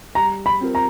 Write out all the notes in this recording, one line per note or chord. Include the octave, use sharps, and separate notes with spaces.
G3 A#5
B5
C4 F4 A#4
A#5